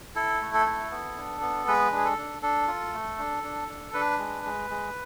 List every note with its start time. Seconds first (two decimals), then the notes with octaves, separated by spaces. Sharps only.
0.15 E4 A4
0.42 A3
0.54 A4
0.66 E4
0.91 B3
1.17 D4
1.41 B3
1.67 G#3 B4
1.92 D4 G#4
2.05 A4
2.18 D4
2.42 D4 A4
2.68 F4
2.93 A3
3.19 D4
3.44 D4
3.68 D4
3.94 D4 B4
4.19 G#3
4.45 G#3
4.70 G#3